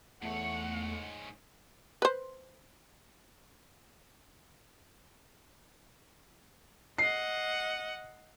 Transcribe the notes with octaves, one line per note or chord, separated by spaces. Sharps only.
E2 G#2 A3 C#5 F#5
B4 C5
D#5 F#5 C7